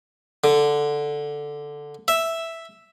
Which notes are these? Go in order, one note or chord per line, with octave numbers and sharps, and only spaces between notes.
D3
E5